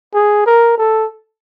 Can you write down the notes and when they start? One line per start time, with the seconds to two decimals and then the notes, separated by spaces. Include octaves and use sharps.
0.14 G#4
0.46 A#4
0.78 A4